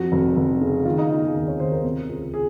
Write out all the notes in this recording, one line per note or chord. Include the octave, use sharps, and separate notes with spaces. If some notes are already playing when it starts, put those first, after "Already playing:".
Already playing: F2 F#4
F1
F1
C#3
D#3 F4
D#4
D#3 F4
G#4
D#2
C#5
D#2 C5
A#4
C3
C#2
G#4